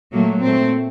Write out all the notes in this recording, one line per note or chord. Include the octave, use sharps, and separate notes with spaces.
A#2 F#3 A3 A#3
A#2 A3 C4